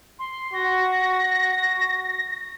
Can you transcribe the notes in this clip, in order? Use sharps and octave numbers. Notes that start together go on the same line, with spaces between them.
C6
F#4 A#6